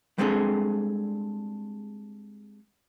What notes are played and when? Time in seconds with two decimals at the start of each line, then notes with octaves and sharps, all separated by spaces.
0.18 G3 G#3 C4 D4 G#4 A4